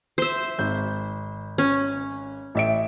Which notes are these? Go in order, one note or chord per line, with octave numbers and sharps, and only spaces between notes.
C5 E5
G#1 G6
C#4
A1 E5 D7